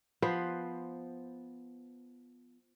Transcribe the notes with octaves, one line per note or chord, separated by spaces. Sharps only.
F3 B3 B4 C5